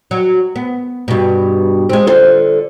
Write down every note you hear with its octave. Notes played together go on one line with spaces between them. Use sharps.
F#3
B3
G2 B2
G#3 C4
D3 F4 C5